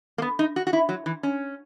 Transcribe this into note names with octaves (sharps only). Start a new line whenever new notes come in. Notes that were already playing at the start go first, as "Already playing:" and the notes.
A#3
B3
D#4
F#4
F#4
E4
F#3
E3
C#4